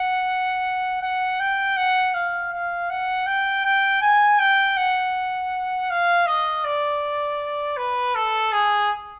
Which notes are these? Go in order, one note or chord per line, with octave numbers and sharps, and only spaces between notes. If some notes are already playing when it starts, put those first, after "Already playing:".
Already playing: F#5
F#5
G5
F#5
F5
F5
F#5
G5
G5
G#5
G5
F#5
F5
D#5
D5
B4
A4
G#4